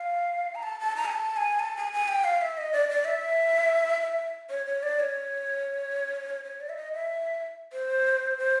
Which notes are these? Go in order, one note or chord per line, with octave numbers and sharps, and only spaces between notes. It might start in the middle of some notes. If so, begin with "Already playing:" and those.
Already playing: F5
A#5
A5
A5
A#5
G#5
A5
G#5
A5
G#5
G#5
G5
F5
E5
D#5
D5
D5
E5
E5
C#5
C#5
D5
C#5
C#5
D5
E5
D#5
E5
C5
C5